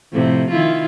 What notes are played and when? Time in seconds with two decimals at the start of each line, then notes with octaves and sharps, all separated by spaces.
0.12 F2 A2 C3
0.50 D#3 E4 F4